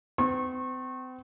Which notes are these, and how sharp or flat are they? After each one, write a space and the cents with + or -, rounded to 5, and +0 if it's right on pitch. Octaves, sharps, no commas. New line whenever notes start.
C4 -40 C#6 -35